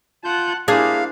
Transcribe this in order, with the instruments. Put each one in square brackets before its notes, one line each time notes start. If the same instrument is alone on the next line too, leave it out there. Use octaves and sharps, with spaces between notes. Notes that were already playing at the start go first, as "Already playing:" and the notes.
[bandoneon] F4 G6 [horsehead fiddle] F#5 A5
[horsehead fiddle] A#3 E4 [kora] D4 C5 [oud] G#4 [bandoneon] F5